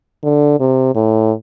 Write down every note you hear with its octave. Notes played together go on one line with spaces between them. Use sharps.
D3
C3
A2